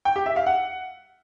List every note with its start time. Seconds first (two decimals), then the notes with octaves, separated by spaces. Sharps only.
0.05 G5
0.16 G4
0.26 E5
0.36 F5
0.46 F#5